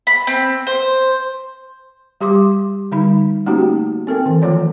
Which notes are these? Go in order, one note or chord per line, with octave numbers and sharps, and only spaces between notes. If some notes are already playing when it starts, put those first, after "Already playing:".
B5
C4
C5
G3 G4 C6 D6
D3 G3 D#4 B5
A3 A#3 C#4 D#4 F#4 G4
C4 A4 A#4 G5
D#3 E3
F3 A3 F4 C#5 D5